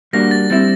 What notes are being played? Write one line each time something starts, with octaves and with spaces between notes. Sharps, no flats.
G3 A#3 D4 F#4 A#6
A6
G3 C4 E4 A6